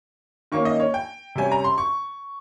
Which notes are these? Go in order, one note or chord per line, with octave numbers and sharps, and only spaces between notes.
D#3 A#3 C#4 C#6
D#5
C#5
G5
C3 G3 C#4 G#5
A#5
C6
C#6